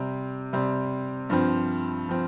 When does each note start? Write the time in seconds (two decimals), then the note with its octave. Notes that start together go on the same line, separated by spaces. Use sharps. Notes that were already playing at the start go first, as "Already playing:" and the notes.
Already playing: C3 G3 C4
0.53 C3 G3 C4
1.30 G2 F3 C4
2.09 F3 C4